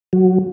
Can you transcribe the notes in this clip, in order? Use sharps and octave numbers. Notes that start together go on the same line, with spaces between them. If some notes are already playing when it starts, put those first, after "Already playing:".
F#3